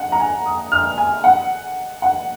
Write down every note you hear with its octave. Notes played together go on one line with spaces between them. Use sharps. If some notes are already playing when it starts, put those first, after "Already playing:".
Already playing: F#5
A#5
G#5
D#6
F6
G#5
F#5
F#5